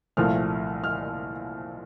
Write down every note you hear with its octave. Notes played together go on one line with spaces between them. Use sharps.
C2 A#2 F3 A3 F6
F6